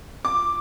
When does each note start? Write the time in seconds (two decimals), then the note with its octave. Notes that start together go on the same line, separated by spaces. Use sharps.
0.25 D6